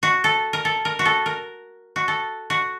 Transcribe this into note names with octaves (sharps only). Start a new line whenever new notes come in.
F#4
A4
A#4
A4
A#4
F#4
A4
A#4
F#4
A4
F#4